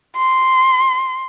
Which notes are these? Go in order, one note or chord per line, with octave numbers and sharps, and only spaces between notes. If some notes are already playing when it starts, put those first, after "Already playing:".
C6